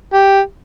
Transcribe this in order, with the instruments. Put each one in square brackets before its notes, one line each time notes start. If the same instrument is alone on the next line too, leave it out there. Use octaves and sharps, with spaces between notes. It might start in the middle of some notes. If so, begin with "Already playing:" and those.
[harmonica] G4